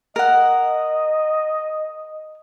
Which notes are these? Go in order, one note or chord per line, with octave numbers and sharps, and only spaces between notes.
A#4 D#5 F#5